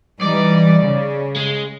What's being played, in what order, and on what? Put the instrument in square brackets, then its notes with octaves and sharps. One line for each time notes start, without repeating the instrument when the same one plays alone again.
[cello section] E3 G3 D#4 [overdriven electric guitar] D5
[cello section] C#3
[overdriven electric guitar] G#3